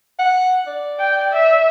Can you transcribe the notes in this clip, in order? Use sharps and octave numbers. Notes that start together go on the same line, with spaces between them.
F#5
D5
G5
E5